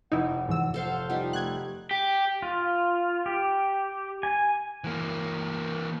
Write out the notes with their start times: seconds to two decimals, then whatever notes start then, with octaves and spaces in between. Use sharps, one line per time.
0.12 F1 D#4 E4 F#5
0.49 G#2 E3 E6
0.74 A4 C5 F5
1.10 G3 D#4 F4
1.33 A3 F#6 G#6
1.91 G4
2.42 F4
3.26 G4
4.23 G#5
4.84 E3 A#3